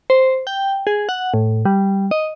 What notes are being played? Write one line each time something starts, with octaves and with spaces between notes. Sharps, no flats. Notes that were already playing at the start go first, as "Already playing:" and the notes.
C5
G5
G#4
F#5
A2
G3
D#5